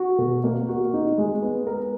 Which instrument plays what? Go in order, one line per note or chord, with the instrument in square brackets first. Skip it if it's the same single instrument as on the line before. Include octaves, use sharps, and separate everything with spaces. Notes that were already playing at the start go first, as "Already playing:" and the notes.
Already playing: [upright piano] F#4
B2
A#3
F#4
D#4
G#3
B3
A#4